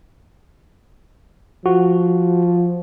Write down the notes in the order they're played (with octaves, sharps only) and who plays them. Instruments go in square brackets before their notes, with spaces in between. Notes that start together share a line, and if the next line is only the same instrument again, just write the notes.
[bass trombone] F3 [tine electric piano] F#4